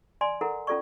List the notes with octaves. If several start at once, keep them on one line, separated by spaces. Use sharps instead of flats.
D5 G#5 C6
E4 A4 A#4 F#5
C#4 F4 A4 D5 C#6